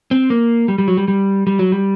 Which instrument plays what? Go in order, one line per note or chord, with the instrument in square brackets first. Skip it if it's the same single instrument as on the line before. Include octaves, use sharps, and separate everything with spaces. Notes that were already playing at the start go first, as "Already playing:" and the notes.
[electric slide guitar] C4
A#3
G3
G3
F#3
G3
G3
G3
F#3
G3